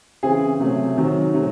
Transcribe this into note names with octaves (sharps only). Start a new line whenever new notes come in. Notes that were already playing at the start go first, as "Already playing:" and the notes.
C#3 E3 C4 G#4
C3 F#3 A3
D#3 F#3 C4
C3 F#3 A3